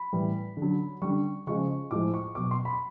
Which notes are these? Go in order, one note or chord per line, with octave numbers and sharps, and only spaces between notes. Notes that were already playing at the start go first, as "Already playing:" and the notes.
Already playing: B5
A2 E3 G3
D3 F#3
D3 G3 C#6
C#3 F3 G#3 C#6
A2 F3 G#3 D6
C#6
B2 F#3 D6
C6
B5